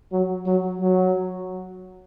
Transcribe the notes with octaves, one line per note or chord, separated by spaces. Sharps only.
F#3
F#3
F#3